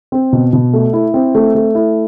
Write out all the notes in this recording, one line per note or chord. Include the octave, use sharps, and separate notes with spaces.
C4
B2
B2
A3
E4
C4
A3
A3
E4